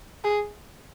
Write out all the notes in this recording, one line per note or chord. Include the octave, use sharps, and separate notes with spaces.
G#4